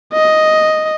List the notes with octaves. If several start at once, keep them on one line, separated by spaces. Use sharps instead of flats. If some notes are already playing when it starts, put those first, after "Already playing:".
D#5